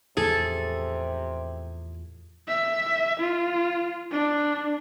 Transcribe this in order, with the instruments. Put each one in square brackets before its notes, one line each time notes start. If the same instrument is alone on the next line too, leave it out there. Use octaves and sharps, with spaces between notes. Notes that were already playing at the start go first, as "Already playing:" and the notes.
[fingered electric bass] E2 A2 F3 [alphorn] C3 [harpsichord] G#4 [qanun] A4
[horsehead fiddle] E5
F4
D4